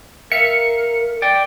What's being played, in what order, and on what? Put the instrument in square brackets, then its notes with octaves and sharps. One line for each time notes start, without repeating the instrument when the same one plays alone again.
[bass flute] A#4 [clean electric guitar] E5 F5 [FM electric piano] C#7
[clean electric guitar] D5 G5